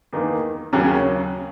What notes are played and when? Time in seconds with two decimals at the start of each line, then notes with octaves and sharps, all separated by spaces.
0.13 E2 D#3 A#3 D#4
0.73 D#2 C#3 F#3 C#4